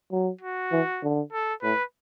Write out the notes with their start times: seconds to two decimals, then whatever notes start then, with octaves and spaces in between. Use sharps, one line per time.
0.12 F#3
0.41 F#4
0.72 E3
1.03 D3
1.33 A4
1.62 A2 B4